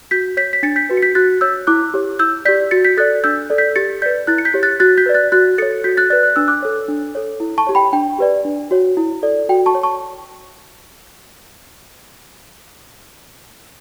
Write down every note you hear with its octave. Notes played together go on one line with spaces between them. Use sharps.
F#4 G6 B6
C#5 G6 B6
B6
D4 A6 C#7
G6 B6
F#4 B4
C#7
G6 B6
F#4 F#6 A6
C#5 E6 G6
E4 D6 F#6
G4 C#5
E4 E6 G6
G4 D5 G6 B6
F#4 A6 C#7
G6 B6
A4 D5 F#6 A6
D4 E6 G6
A4 D5
G6 B6
G4 A6 C#7
B4 D5 G6 B6
E4 F#6 A6
C#7
G6 B6
G4 C#5
F#6 A6
F#4 F#6 A6
G6 B6
B4 D5
F#6 A6
F#4 F#6 A6
A4 C#5 A6 C#7
F#4 G6 B6
F#6 A6
B4 D5 F#6 A6
F#6
D4 E6
D6 F#6
A4 C#5
D4
A4 C#5
E4
A5 C#6
G4 C#5
G5 B5
D4 G5
G4 B4 D5
D4
F#4 C#5
E4
A4 D5
F#4 G5
A5 C#6
C#5
A5 C#6